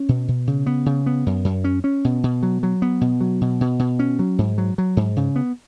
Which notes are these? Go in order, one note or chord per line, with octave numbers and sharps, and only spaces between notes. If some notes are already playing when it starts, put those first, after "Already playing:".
Already playing: C#4
B2
B2
C#3
B3
C#3
B3
F#2
F#2
C#4
C#4
B2
B2
F#3
F#3
B3
B2
F#3
B2
B2
B2
C#4
F#3
G#2
F#3
F#3
G#2
C#3
B3